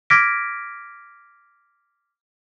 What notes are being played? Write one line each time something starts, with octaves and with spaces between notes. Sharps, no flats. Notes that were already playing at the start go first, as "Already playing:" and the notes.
D6 F6 G#6 A#6 B6 D7